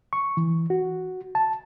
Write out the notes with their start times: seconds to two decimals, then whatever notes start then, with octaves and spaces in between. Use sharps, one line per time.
0.13 C#6
0.37 E3
0.70 F#4
1.35 A5